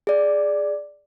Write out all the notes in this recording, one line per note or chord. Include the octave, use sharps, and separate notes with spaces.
G#4 D5